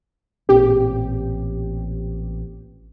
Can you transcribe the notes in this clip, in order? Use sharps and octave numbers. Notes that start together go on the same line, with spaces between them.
A1 A#2 C4 G4